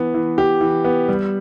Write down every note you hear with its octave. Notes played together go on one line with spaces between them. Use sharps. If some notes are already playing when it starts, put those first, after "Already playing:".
Already playing: E3 B3
E3
G4
E3
B3
G3